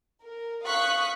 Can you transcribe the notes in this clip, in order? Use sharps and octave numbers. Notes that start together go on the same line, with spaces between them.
A#4
F5 C#6 D#6 F#6 B6